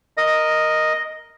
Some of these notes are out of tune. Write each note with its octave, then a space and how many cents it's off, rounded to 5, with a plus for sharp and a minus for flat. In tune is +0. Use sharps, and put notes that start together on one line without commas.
A#4 +0 D#5 +0